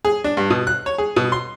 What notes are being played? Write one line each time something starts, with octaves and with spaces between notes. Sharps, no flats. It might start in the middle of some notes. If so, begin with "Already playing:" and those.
G#4
D4
G2
B2
F#6
C#5
G#4
B2
C6